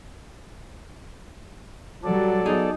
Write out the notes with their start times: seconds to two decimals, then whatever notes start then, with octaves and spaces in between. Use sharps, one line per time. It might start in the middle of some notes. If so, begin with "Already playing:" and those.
2.04 F#3 G3 A4 D5
2.45 B3 D#4 G#4